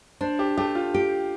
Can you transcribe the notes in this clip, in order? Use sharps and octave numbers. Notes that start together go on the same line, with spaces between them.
D4 C5
G4
A3 G4
F4
G4